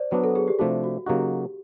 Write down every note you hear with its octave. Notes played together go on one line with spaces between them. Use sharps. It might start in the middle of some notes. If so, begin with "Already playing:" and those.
Already playing: C5 D5
F#3 B3 D4 B4
A4
G#4
G4
C3 F3 A3 D4 F#4
F#4
C#3 F#3 A#3 D#4 F#4 G4